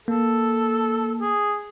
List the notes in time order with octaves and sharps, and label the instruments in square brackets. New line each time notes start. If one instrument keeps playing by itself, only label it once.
[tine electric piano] A#3 [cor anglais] A4
[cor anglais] G#4